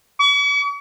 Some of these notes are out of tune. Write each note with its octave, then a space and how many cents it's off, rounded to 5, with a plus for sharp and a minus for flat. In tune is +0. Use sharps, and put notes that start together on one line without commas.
C#6 +45